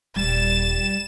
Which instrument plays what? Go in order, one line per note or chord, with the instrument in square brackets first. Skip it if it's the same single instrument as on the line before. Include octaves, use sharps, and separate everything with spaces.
[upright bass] D#1 [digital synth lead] G3 [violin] A6 [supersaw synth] E7